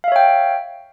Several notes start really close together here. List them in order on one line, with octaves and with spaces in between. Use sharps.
F5 E5 C#5 G5